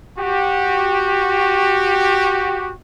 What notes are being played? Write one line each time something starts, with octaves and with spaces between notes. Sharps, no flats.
F#4 G4